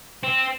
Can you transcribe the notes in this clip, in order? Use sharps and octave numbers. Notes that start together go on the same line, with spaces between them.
C4